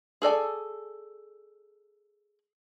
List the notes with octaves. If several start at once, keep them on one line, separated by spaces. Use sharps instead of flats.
G#4 A4 D5 G#5